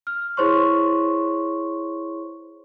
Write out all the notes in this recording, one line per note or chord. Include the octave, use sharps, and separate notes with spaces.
F6
E4 G#4 C5 C#5 C6 C#6